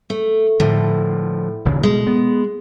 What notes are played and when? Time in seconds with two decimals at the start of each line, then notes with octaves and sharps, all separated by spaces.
0.10 A3
0.60 A2 D3 F3
1.65 D#1 G#1 C#3
1.83 B2 G#3
2.07 B3